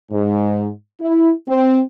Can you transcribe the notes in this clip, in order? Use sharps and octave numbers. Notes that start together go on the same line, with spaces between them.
G#2
E4
C4